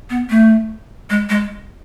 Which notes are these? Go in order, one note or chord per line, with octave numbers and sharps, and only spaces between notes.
B3
A3
G#3
G#3